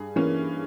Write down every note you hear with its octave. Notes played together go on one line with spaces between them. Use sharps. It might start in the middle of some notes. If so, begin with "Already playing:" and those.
Already playing: G2 G#4
E3 A#3 C#4